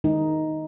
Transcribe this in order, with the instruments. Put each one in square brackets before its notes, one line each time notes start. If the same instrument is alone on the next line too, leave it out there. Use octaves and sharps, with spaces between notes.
[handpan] D#3 G#3 D#4